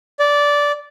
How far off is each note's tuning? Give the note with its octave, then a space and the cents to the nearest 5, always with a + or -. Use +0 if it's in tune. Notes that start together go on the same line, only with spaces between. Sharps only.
D5 -15